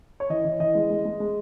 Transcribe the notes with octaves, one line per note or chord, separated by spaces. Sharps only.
C#5
E3 D#5
E3
E3 D#5
G#3
G#3
G#3
G#3